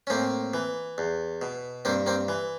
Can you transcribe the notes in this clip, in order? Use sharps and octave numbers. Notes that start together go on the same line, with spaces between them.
C#4
A2 A#3 C4
E3
E2
B2
G2 A#3 C4
A#3 C4
E3